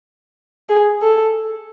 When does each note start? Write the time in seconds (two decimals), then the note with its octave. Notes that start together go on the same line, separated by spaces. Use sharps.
0.69 G#4
1.01 A4